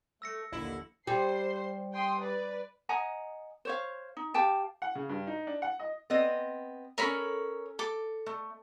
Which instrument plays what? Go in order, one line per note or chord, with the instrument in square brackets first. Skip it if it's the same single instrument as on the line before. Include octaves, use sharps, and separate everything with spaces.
[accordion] A3 [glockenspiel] E6 A#6 C#7
[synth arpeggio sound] A#1 [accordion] D#2 D3 [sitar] E4
[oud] G3 [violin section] C5 C7
[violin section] G5 C6 D#6
B4 D5
[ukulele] D#5 F#5 G#5 A#5
C5 C#5 F5
D#4
G4 F5 G5 A5
[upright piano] F#5
C#3
G2
D#4
D4
F#5
D#5
[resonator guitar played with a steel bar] B3 C4 D#5
[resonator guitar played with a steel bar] C#4 A4 [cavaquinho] A#4 C#5 B5
[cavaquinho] A4 D6
[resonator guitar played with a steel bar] A3